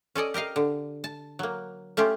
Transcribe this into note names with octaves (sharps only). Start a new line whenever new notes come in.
C#4 A4 D5 D#5
G4 A#4 D#5 F5
D3
A5
F#3 A#3
A3 C#4 F4 G4